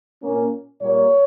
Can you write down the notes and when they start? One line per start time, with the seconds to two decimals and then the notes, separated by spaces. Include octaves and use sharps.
0.23 A#2 A#3 C#4
0.81 A#2 G3 A#3 C#5